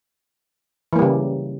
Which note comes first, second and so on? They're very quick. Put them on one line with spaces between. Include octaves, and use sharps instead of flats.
E3 A#3 G3 C#3